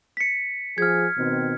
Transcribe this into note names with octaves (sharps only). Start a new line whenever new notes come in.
B6 C#7
F3 G#4 F6 G#6
B2 D#3 C4